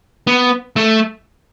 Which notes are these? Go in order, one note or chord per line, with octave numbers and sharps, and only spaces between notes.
B3
A3